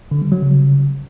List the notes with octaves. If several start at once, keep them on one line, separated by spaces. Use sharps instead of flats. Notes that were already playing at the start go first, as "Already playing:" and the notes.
D3
G3
F#3
C#3